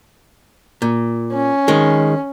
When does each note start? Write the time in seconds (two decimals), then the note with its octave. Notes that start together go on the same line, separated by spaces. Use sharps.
0.82 A#2
1.33 C#4
1.68 D#3 G#3